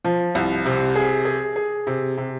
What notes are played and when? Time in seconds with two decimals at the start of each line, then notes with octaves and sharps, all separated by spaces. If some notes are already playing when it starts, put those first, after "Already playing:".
0.04 F3
0.35 C2
0.66 C3
0.96 G#4
1.25 G#4
1.56 G#4
1.87 C3
2.17 C3